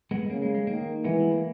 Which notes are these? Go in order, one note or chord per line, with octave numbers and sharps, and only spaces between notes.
G#3 B3
C#3 A#3
G#3
G#3
D#3 A#3
E3 G#3 B3
B3
A#3